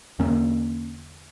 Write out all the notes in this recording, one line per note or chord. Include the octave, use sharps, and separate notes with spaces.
E2 D3 A#3 C#4